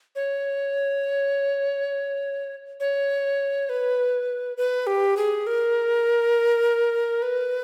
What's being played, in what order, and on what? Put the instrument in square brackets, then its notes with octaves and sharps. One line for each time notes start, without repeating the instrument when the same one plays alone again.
[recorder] C#5
C#5
B4
B4
G4
G#4
A#4
B4